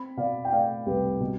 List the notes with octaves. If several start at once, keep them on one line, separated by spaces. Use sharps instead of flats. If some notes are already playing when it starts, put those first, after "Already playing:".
Already playing: C4 B5
B2 D5 F5
G5
A3 D5 F5
C2 G4 B4
B2